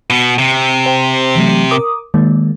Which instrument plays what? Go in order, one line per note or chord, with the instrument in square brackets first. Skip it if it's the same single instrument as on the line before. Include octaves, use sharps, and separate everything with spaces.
[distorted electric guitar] B2 B3
C3
[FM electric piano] C5 G5
E3 F#3 A3
A#4 D6 D#6
D#3 G#3 A#3